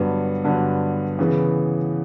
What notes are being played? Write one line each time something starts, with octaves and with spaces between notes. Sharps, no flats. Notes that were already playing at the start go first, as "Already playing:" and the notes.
Already playing: G2 D3 F#3 B3
G2 D3 F#3 B3
C#3 E3 B3